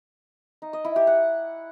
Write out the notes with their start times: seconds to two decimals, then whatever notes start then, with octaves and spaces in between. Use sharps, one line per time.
0.62 D#4
0.73 D#5
0.85 E4
0.96 G4
1.07 F#5